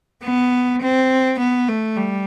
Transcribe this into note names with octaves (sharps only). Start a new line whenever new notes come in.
B3
C4
B3
A3
G3